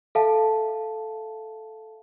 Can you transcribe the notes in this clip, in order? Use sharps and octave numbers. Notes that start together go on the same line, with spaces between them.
A4 E5 F5 A5